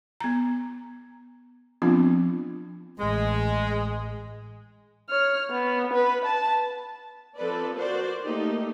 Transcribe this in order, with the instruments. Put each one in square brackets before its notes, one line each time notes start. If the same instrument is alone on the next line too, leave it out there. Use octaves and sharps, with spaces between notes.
[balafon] B3 A#5
F3 B3 C4 D4 F4
[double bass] A1 [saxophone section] G#3
[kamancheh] C#5 F6
B3
B4
A5
[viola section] F3 C4 A4 B4 D5
F#4 A#4 C5 D5
A3 A#3 D#4 G4